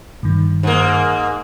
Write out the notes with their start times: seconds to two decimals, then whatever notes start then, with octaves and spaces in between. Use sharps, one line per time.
0.23 G2 D#3
0.63 G#2 A#3